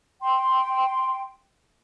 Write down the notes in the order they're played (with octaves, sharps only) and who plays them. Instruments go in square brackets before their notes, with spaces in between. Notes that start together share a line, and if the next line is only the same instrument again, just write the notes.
[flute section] G5 C6